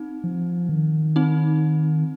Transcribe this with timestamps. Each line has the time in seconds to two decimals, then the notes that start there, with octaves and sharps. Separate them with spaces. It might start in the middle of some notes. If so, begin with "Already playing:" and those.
Already playing: C4 D#4
0.24 F3
0.69 D#3
1.16 C4 D#4